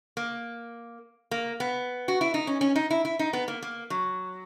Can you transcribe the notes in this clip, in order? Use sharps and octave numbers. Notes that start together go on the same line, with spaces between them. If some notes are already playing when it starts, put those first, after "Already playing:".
A#3
A#3
B3
F#4
E4
D#4
C#4
C#4
D#4
E4
E4
D#4
B3
A#3
A#3
F#3